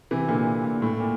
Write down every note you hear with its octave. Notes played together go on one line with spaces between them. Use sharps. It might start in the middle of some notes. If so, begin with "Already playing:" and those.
C3 E3
A#2 D3
A#2
A2
A#2